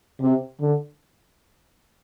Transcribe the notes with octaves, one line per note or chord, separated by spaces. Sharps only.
C3
D3